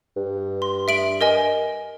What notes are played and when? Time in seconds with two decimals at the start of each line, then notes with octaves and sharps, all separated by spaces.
0.17 G2
0.62 C6
0.88 E5 D7 F#7
1.21 A#4 D#5 G#5